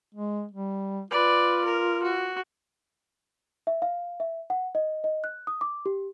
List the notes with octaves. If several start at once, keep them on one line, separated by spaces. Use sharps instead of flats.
G#3
G3
F4 B4 D5
A#4
F#4
E5
F5
E5
F#5
D#5
D#5
F#6
D#6
D6
G4